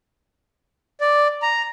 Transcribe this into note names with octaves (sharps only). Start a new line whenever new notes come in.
D5
A#5